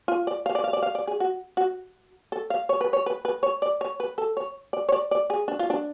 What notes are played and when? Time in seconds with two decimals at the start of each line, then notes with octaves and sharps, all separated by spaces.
0.08 F4
0.27 D5
0.46 F5
0.55 D5
0.64 F5
0.73 D5
0.83 F5
0.95 D5
1.07 G#4
1.20 F#4
1.57 F#4
2.32 A4
2.50 F5
2.69 C#5
2.81 B4
2.93 C#5
3.06 B4
3.25 B4
3.43 C#5
3.62 D5
3.81 C#5
4.00 B4
4.18 A4
4.37 C#5
4.73 D5
4.89 C#5
4.92 D5
5.11 D5
5.30 G#4
5.48 D4
5.59 F4
5.70 D4